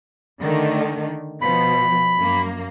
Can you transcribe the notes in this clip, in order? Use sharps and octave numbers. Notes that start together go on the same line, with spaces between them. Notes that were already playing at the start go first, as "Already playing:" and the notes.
D3 D#3 A3
B2 F3 B5
F#2 A#3